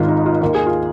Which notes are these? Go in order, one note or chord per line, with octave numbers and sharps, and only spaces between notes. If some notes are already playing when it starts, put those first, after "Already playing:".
Already playing: G#1 G#2 D#3 F4
D#4
F4
D#2 D#3 A#4
G#4
F4